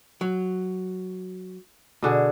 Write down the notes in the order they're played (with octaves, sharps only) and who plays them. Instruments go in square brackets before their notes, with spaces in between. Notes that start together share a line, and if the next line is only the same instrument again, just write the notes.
[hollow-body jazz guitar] F#3
[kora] B2 D3 G#4